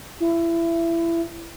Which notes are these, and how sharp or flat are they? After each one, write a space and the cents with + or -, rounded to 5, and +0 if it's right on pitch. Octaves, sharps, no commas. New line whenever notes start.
E4 +25